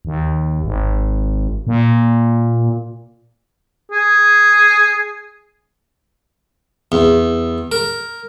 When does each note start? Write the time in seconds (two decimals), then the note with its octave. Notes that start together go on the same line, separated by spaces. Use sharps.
0.05 D#2
0.64 G#1
1.67 A#2
3.91 G#4
6.92 E2
7.72 A#4